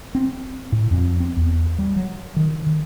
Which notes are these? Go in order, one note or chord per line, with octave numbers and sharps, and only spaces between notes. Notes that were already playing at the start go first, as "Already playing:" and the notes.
C4
A2
F2
C4
E2
G3
F#3
D#3
D#3